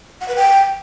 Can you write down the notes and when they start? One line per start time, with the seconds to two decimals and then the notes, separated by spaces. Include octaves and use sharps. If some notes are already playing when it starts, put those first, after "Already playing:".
0.21 F#5
0.28 B4
0.36 G5